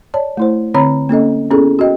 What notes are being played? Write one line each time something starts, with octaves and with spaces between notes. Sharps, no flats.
C#5 D5 A5
A3 E4 C5
D3 C4 C#5 A#5 B5
A#3 C#4 A4 D#5
B3 C#4 E4 G#4 A4
F#4 D#5 G5